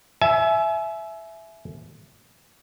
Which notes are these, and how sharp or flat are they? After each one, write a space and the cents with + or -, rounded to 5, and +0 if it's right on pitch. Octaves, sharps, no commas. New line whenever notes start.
E5 +5 G#5 +35